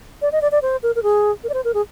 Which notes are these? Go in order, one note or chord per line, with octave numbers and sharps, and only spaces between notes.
D5
D#5
D5
D5
C5
A#4
A#4
G#4
A#4
D5
C5
A#4
G#4